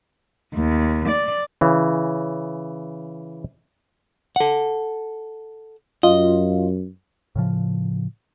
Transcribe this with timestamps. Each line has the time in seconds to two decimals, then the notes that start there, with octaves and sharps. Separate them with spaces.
0.54 D#2
1.08 D5
1.61 C#3 E3
4.36 A4 F#5
6.03 F#2 F4 D#5
7.36 A2 C#3 F3